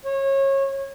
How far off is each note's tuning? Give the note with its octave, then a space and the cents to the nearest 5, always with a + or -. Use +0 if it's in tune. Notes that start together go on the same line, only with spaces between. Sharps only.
C#5 -25